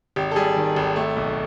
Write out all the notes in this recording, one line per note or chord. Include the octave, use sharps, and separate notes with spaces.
G#1 G4
A4
G3 G#4
D#3
G#1
A3
B1